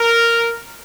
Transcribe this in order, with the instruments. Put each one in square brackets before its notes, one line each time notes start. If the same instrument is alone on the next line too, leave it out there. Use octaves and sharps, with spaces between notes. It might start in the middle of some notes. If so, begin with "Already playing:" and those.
Already playing: [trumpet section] A#4